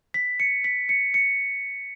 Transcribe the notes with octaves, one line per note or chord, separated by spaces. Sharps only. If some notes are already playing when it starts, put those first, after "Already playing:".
B6
C#7
B6
C#7
C#7